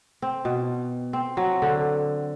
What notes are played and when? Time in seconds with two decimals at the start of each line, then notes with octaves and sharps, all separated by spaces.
0.22 C4
0.45 B2
1.13 C4
1.37 F#3
1.62 D3